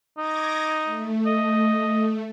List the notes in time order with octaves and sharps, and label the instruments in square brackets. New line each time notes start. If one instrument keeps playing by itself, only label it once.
[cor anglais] D#4 [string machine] D6 G#6 A#6
[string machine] A3
[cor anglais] D#5